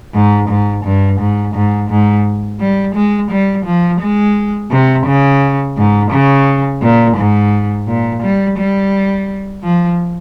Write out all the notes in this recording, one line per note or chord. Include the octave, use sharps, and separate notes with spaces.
G#2
G#2
G2
G#2
G#2
G#2
G3
G#3
G3
F3
G#3
C3
C#3
G#2
C#3
A#2
G#2
A#2
G3
G3
F3